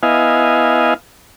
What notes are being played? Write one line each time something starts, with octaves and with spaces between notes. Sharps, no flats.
B3 E4 D#5 F5 G#5